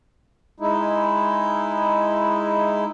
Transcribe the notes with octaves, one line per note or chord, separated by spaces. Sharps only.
G#3 D#4 E4